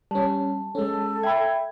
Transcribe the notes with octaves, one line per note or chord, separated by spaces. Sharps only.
G3 C#4 A5
G#3 C#4 A4
E5 G5 B5 G#6